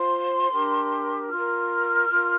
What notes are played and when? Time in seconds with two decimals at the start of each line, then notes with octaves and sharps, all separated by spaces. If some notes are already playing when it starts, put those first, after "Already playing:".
Already playing: F4 C5 C6
0.52 D4 G4 A#4
1.30 F4 A#4 F6
2.09 F4 A#4